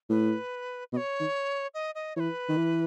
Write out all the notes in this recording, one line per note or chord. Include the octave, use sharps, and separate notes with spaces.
A2 B4
B2 D#5
C#5
D#3
D#5
D#5
E3 B4 C#5
D#3
E3